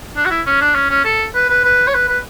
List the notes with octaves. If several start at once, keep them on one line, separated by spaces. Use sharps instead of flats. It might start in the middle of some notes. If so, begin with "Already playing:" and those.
D4
F#4
E4
C#4
D4
C#4
C#4
A4
B4
B4
B4
C#5
B4
B4